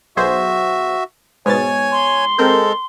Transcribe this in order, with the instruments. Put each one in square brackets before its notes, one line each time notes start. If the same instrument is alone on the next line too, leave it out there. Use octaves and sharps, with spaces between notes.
[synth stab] B1 G#4 C5 [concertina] F#4 E5
[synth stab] G#2 B2 A6 [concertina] C#5 G#5
[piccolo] C6
[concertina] G#3 A4 [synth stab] C4 A#4 G6